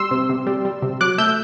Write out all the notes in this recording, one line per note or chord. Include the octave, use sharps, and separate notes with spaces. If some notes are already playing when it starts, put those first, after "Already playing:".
Already playing: G3 C6 E6
C3
C3
G3
G3
C3
F#3 D6 F#6
A3 E6 G6